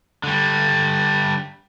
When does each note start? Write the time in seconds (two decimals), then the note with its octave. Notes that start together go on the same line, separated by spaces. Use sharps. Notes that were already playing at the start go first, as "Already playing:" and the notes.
0.24 D3 G3